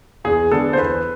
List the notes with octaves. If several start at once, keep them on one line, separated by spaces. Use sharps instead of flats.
E2 G#4
D3 G#3 B3 D4 A4
C5
E2 B4